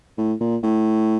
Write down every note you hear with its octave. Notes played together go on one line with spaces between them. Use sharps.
A2
A#2
A2